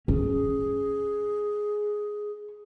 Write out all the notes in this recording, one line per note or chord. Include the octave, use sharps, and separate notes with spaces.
C#4 G#4